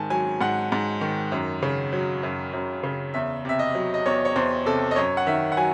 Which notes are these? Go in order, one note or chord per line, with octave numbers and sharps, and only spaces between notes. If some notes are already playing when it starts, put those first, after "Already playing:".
Already playing: G#2 D#3 G#5 A5
F#3 G#5
G#2 F#5
G#2
D#3
F#2
C#3
F#3
F#2
F#2
C#3
E2 E5
C3 E5
D#5
F#3
D#5
E2 C#5
C#5
E2 C5
C3 A4
D#5
F#2 C#5
F#5
D#3 E5
F#5
F#3 G#5